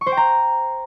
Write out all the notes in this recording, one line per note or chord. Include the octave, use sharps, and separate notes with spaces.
C#6
C5
G5
A#5